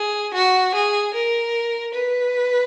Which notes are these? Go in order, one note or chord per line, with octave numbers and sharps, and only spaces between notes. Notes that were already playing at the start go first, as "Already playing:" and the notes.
Already playing: G#4
F#4
G#4
A#4
B4